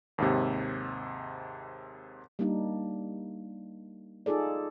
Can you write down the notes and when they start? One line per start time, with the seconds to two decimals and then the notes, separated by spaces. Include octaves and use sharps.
0.18 D#2 G#2 C3
2.39 G3 A#3 D4 D#4
4.26 D#4 F4 G#4 A4 D5